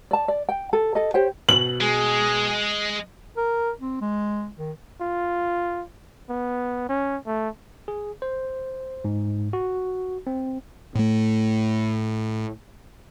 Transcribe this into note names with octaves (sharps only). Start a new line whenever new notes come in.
D5 A5
D5
G5
A4
A4 D#5
G4 C5 C#5 G5
B2 F#7
G#3 G#4
A#4
C4
G#3
D#3
F4
B3
C#4
A3
G#4
C5
G#2
F#4
C4
A2 A3